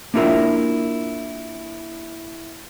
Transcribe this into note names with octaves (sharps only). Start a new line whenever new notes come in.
A#3 D4 E4 F4 A#4 E5